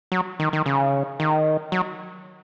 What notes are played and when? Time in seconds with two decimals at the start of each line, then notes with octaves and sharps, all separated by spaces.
0.12 F#3
0.40 D#3
0.53 D#3
0.66 C#3
1.20 D#3
1.72 F#3